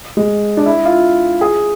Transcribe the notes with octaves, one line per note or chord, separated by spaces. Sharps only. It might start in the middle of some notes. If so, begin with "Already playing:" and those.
G#3
D4
E4
F4
G#4